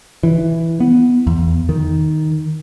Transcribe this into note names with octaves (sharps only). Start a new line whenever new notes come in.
E3
B3
E2
D#3